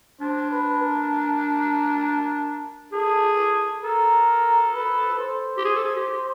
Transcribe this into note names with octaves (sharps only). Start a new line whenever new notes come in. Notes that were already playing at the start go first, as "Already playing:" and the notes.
D4 C5
B4
A#4
G#4 A4
A4 A#4
B4
C5
G4
G#4
A4
G#4
G4